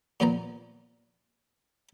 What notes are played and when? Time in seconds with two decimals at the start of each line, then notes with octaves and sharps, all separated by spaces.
0.20 A#2 F3 B3 C5 A#5